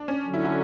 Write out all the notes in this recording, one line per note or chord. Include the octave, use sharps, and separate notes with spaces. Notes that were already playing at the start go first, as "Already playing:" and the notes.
Already playing: D4
C#4
D3 F#3 C#4
E4
E4